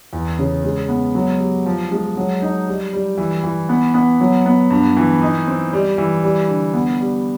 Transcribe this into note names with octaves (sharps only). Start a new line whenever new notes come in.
E2
C#3
G#3
B3
F#3
G4
F3
G#3
F#3
D#4
G3
G3
E3
E3
B3
B3
F#3
B3
G2
E3
D#4
C4
G3
E3
G3
D3
B3
G3